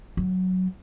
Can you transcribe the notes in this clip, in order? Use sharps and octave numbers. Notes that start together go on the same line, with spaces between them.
F#3